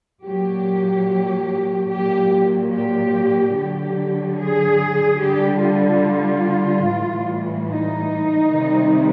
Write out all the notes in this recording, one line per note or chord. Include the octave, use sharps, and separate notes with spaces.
A#2 F#3 G4
A#2 F#3 G4
G4
D3 F#3 G4
G#4
D3 G3 G4
F4
A2 E3 G3
D#4
C3 D#3 G3